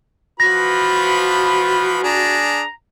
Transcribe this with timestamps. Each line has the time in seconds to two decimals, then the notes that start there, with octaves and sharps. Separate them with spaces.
0.40 E3 F3 F#4 B4 B5 A#6
2.03 D4 G#4 A#5